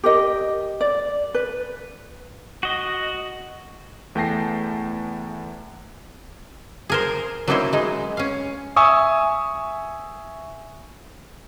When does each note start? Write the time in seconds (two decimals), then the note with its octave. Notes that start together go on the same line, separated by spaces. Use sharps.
0.04 G4 A#4 D#5
0.81 D5
1.34 B4
2.63 F#4 D#5
4.15 E2 A3 G5 A5 A#6 C7
6.90 G#4 A#4 C5
7.48 F#3 A#3 C#4 D#4 E4 C5
7.73 G#3 D#4
8.17 C#4 F5
8.76 E5 G#5 C#6 D#6 E6